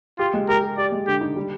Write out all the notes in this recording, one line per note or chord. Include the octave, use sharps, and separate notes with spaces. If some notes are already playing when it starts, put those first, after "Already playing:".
F4 G4
G#3
G4 A#4
G4
G4 D5
G#3
D3 G4
D#4
G3